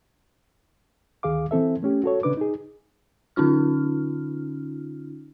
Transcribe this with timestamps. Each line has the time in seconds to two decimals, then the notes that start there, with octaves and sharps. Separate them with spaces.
1.23 D2 D#3 G#4 F5 D6
1.51 E3 C4 A4 E5
1.83 A3 C#4 G4
2.04 F#4 A4 C#5
2.23 C#3 D4 B4 D6
2.37 D#4 G#4
3.36 D3 C#4 D#4 F4 F6